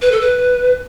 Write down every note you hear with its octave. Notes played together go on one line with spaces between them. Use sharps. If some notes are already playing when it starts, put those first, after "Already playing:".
B4
A4
B4